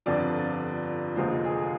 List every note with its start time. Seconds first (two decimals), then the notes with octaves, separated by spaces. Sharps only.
0.06 G1 F2 D3 F3 D5
1.16 F1 D#2 D3 F3 G#3 C5
1.45 G#4